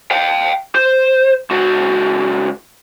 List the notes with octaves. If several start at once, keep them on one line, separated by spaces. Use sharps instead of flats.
F5 G5
C5
C#2 F#4